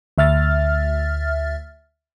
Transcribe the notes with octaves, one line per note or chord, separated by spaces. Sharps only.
D2 E5 F6 A6